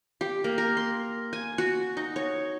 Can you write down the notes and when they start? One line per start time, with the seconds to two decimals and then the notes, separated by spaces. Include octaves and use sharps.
0.21 G4
0.44 A#3
0.58 A#4
0.77 C6
1.33 G#5
1.58 F#4
1.97 D#4
2.16 C#5